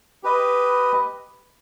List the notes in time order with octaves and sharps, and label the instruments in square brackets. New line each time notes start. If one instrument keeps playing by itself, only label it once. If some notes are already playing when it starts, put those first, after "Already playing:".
[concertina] G4 B4 D#5